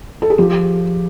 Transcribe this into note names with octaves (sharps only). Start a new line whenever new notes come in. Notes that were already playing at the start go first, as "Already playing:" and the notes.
A4
G#4
F3 G4